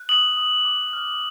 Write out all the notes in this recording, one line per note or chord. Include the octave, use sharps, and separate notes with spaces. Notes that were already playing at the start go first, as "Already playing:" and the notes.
Already playing: F#6
D#6 F#7
D#6
D6
F6